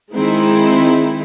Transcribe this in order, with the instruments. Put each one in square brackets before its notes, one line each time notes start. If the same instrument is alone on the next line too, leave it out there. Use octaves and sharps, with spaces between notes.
[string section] D#3 G#3 C4 D#4 E4